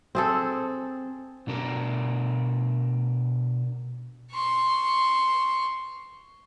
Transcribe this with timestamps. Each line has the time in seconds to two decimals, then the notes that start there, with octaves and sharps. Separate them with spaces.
0.15 C4 G#4 A4
1.47 B2 D4 G4 A#4
4.32 C6 C#6